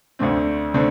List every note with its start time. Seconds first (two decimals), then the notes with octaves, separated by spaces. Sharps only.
0.19 D2 D3 A3 C4
0.74 D3 A3 C4